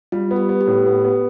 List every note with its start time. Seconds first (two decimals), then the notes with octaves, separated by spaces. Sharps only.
0.12 G3 F4
0.31 B3
0.36 G4
0.49 B3
0.61 G4
0.67 A2
0.86 B3
1.05 B3